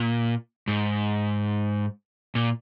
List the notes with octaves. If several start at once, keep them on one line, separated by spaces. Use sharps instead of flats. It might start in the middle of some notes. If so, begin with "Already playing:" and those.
Already playing: A#2
G#2
A#2